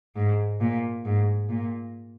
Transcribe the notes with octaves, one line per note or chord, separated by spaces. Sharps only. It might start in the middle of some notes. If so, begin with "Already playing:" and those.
G#2
A#2
G#2
A#2